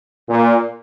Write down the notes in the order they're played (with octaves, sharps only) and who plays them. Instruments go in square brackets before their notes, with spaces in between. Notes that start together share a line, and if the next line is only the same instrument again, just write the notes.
[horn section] A#2